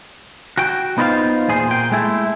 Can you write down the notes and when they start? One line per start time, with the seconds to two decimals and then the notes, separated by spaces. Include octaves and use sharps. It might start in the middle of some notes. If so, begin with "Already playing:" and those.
0.57 F#4 G5
0.98 B3 D#4 F4 B4 C5 F5
1.48 E2 A#2 G#4 C5
1.69 A#2 G5
1.92 G#3 A3 E4